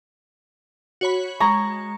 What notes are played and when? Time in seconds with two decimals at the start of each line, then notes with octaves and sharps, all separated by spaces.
1.01 F#4 C#5 B5
1.40 G#3 A#5 C#6